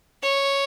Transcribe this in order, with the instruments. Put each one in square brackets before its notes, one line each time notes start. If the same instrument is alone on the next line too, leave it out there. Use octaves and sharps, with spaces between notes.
[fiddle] C#5